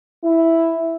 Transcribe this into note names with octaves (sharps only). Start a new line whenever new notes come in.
E4